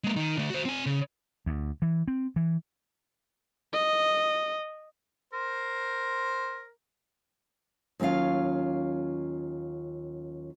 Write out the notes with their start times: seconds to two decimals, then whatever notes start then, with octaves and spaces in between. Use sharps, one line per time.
0.04 G#3 A#3
0.16 D#3 D#4
0.37 D3 A3
0.50 F#4 C5
0.65 C4 G#5
0.86 C#3
1.46 D2
1.82 E3
2.08 C4
2.36 E3
3.73 D#5
5.33 A#4 C5
8.00 D#2 F#3 C#4 F4 F5